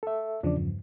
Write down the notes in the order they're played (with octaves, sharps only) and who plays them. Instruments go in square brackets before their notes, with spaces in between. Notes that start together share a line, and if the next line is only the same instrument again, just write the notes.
[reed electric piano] A4 E5
[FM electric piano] E2 C#3 F3 [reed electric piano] D4 D5
[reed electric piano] G2